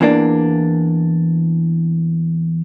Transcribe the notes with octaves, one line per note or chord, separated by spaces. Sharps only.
E2 E3 A#3 D4